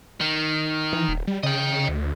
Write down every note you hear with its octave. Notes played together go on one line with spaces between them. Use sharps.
D#3
E3
D#1
G3
C#3 D#5 G5
D2